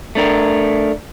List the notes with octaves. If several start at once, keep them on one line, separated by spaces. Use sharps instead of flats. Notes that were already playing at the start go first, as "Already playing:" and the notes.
A3 D4 A#4